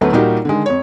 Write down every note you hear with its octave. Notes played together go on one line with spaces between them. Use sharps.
D2 F#3 A3 B3
A#2 G3 A#3 D#4 F#4 G4
D3 D#3 G#3
F2 C#5